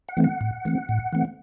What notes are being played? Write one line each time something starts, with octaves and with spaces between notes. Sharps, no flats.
F#5
E3 A3 C4
F#5
A2
E3 A3 C4
A2
E3 A3 C4